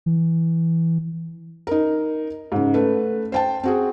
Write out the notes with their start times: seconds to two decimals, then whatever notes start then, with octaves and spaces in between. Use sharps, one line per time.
0.06 E3
1.67 D#4 A#4
2.52 G#2 C#3
2.74 A3 B4
3.32 C5 G5 A5
3.63 C4 F#4 G#4